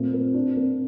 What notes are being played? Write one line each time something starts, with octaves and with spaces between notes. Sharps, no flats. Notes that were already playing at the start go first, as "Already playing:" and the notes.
Already playing: A#2 A3 C4
A#3
D4
A#3